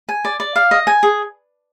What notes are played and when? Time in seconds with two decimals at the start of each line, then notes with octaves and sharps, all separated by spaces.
0.09 G#5
0.25 D5
0.40 D5
0.56 F5
0.71 D#5
0.87 G#5
1.03 G#4